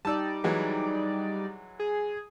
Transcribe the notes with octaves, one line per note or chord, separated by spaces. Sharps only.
G3 D#4 D5 A5 E6
E3 F#3 G#3
G#4